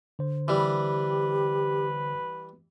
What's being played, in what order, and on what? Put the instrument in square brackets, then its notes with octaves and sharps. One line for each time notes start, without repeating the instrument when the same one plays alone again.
[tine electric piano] D3 C5
[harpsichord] E3 G3 [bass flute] G4 [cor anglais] B4